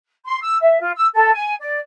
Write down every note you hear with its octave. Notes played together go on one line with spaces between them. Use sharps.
C6
E6
E5
F4
E6
A4
G#5
D5